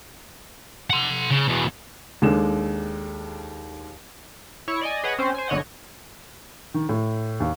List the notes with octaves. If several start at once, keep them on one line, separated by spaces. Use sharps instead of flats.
F#5 C6
C#3
E2 B2
D#2 G#3 D4 A4 E7
E4 C#5 C#6 C#7
D5 D#5 G#5
G#4 B4 C#5 D#5 F#5
C4 C#4 C5
C5 G#5
G1 D3 C#5 D#5 F#5
D#3
A2
D#2